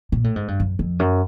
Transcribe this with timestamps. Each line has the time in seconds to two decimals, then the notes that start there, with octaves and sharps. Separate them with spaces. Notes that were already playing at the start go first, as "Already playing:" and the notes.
0.12 A#2
0.24 A2
0.36 G#2
0.48 G2
0.60 F#2
0.79 F2
0.99 F#2